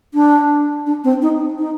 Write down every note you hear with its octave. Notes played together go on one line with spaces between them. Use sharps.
D4
D4
C4
D#4
D#4